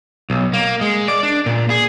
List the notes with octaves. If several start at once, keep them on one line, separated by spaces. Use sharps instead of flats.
B1
A#3
G#3
D5
D4
A#2
G#4